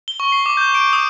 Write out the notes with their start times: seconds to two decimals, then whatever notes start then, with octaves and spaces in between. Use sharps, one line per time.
0.08 G7
0.20 C#6
0.32 C7
0.46 D6
0.57 G6
0.75 D7
0.93 D#6